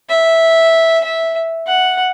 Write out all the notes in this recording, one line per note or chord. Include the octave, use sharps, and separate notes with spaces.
E5
E5
F#5